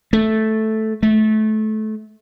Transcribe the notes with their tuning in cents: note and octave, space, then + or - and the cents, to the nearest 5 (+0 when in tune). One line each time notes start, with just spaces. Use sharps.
A3 -5
A3 -25